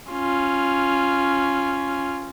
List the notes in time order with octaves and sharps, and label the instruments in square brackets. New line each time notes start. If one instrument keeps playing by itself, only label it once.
[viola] C#4 F4